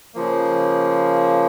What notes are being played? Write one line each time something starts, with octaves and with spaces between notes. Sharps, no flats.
C#3 F3 A#3